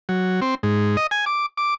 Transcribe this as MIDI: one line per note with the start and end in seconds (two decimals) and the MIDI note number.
0.09 0.40 54
0.42 0.55 60
0.63 0.97 44
0.97 1.07 75
1.11 1.25 80
1.26 1.46 86
1.57 1.74 86